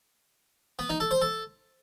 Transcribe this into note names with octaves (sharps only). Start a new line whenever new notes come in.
B3
D#4
A4
C5
A4